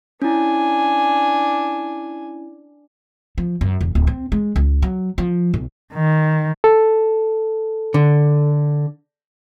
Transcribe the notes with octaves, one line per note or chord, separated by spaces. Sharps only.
C#4 D4 E4 G#5
F3
F#2
E1
D1
C4
G#3
C#2
F#3
F3
B1
D#3
A4
D3